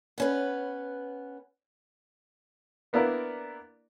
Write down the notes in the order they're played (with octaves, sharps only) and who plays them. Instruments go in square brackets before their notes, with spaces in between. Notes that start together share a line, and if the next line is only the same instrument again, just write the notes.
[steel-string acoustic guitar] B3 C#4 B4
[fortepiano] A#3 B3 D4 E4 A#4 D5